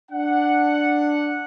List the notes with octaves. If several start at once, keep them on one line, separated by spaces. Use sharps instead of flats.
D4 F#5